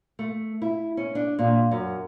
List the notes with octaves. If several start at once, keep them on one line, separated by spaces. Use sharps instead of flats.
A3
E4
C#4
D4
A#2
F#2